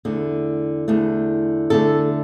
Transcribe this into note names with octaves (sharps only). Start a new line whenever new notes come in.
E2 D3 A3
E2 D3 A3
E2 D3 A3 A4